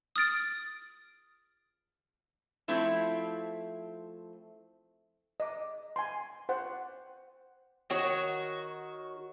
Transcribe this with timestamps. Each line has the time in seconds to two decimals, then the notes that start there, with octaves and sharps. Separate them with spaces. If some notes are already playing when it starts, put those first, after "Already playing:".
0.16 D#6 F6 A6 D7
2.68 F3 A3 C4 E4
5.40 D#5 D6
5.96 G#5 C6
6.49 C5 F#5
7.90 D#3 F#4 C#5